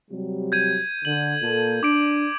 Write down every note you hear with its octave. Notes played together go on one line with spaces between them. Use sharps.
C3 F#3 G3
G6 G#6 D#7
D3 F#7
A#2 A#3 A4
D4 D6 D7